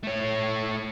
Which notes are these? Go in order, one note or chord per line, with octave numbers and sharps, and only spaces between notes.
A3 C#5